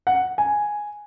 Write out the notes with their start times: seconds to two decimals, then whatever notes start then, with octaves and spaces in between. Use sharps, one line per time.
0.07 F#5
0.38 G#5